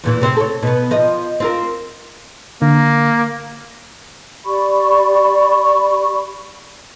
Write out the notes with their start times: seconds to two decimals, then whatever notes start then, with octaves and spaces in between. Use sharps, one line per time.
0.04 E2 A#2 E3
0.21 C3 C4 C5
0.37 A4 C#5
0.62 B2 B3
0.91 F3 D#5
1.40 C4 F4 A#4
2.62 D3 A#3
4.45 G4 D5 B5 C#6